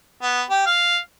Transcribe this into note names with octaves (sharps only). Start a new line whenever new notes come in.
B3
G4
F5